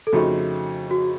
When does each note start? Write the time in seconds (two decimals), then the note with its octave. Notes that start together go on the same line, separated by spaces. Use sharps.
0.07 A4
0.13 F2 C#3 A3 D#4 F#4
0.91 F#4